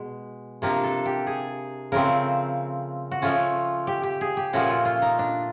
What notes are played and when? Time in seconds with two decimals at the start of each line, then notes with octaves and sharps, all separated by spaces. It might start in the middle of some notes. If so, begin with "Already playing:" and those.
Already playing: B2 G#3
0.62 C3 F3 A#3 D4
0.84 A4
1.06 G4
1.27 G#4
1.92 C#3 F3 A3 C4 A#4
3.11 F#4
3.22 F3 A3 C#4 F4
3.87 G4
4.03 G4
4.21 G#4
4.37 G4
4.53 A#2 F3 A3 C#4 F#4
4.70 F4
4.85 F4
5.02 D#4
5.19 D4